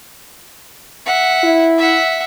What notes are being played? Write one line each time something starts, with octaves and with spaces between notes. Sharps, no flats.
E5 F#5
E4
E5 F#5